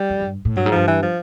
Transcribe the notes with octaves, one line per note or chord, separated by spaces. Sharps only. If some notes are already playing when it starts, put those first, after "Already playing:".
Already playing: G3
F2
G2
A2
G2 F#3
G#2
G2 F3
E3
F3